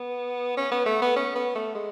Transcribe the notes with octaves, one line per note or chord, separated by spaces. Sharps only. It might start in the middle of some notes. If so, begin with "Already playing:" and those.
Already playing: B3
C#4
B3
A3
B3
C#4
B3
A3
G#3